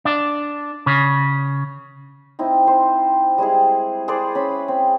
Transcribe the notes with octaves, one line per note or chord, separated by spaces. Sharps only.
D4
C#3
C4 D#4 E4
C5
G3 G#3 E4 G#4
G#4 B4 C5 D5
C#4 B5
C4